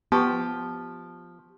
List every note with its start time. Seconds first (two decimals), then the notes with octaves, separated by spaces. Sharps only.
0.12 F3 B3 G4 A5 C#6